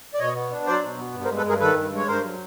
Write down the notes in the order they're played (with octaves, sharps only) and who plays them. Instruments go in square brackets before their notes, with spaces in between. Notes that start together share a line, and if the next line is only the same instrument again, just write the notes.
[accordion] D5
B2 C#5 D#5
B3
D4
F#3 C5 D5
B2
B3
G2
A#4 C5
G#3
A4 B4
G2 G#4 A#4
D#3 A4 B4
G2
G#3 C#5
G2 A#4 C5
F#3